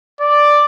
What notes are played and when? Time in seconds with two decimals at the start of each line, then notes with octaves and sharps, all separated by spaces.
0.20 D5